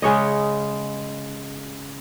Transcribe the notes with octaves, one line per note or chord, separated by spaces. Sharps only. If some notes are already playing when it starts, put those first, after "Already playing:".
C#3 G#3 C#5 D#5